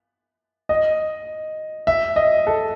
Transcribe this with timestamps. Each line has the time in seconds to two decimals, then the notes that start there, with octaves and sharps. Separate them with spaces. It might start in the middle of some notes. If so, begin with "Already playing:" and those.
0.69 D#5
1.87 E5
2.16 D#5
2.47 A4